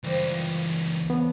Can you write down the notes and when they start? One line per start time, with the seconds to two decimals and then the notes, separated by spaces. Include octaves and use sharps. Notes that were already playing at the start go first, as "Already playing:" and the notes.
0.03 C#2 E3 G3 A#3 C4 F4
1.10 C#3 B3 A4 D5